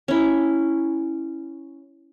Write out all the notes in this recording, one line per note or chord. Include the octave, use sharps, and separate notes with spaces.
C#4 E4